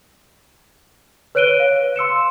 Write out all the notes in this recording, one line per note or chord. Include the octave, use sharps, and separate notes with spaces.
B4 C#5 F#6 D7 D#7 G7
F5
C6 E6 C#7 E7